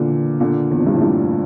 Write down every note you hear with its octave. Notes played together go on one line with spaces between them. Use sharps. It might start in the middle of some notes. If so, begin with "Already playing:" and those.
Already playing: A#2 D3 E3
A#2 D3
E2
F2
G2
A2
G2 A#2